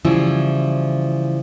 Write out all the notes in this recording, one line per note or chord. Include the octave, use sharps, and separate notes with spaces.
C#3 E3 F3 G3 E4 C5